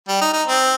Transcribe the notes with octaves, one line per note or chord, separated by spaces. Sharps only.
G3
D#4
D#4
C4